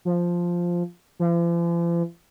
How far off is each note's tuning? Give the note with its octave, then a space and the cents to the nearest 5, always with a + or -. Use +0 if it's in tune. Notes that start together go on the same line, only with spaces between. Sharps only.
F3 +0
F3 -45